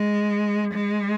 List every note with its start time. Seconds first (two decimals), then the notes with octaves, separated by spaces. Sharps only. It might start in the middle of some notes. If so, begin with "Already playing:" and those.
Already playing: G#3
0.74 G#3